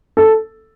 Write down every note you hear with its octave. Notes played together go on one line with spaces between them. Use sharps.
A4